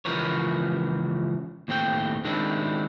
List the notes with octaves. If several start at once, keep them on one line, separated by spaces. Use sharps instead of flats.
C#2 E3 F3 A#4 B4 C#5
D#2 A2 C4 F#4 G5
D#3 G#3 C4 D4 E4